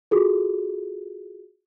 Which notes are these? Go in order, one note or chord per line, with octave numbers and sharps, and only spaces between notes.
F4 F#4 G#4 A4